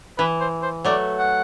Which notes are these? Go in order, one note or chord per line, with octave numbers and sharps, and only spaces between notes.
E3 B4
C5
C5
F#3 A3 D5
F#5